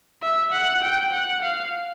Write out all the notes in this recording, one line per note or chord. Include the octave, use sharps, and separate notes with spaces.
E5
F#5
G5
F#5
F5